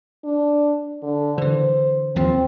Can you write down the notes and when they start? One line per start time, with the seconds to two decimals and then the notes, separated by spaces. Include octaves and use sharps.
0.24 D4
1.03 D3
1.38 D3 E3 C5
2.16 D#2 F3 C4